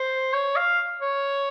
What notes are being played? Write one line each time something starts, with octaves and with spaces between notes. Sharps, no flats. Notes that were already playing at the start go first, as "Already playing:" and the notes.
Already playing: C5
C#5
F5
C#5